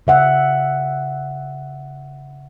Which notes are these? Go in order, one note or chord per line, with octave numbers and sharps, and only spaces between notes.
C#3 E5 F#5